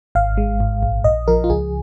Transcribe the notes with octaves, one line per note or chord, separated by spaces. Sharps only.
G#1 F5
G#3
G#2
A#1
A#1 D#5
F3 A#4
F4
C#2 G#4